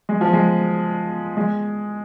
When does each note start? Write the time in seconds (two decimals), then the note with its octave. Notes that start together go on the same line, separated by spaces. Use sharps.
0.09 G#3
0.21 F3
0.33 G#3
1.37 G#3